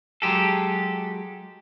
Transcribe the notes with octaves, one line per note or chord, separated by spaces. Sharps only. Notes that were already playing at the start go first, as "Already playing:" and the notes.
F#3 G#3 G4 A4